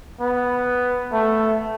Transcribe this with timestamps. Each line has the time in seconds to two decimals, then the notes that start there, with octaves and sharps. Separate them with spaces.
0.20 B3
1.13 A3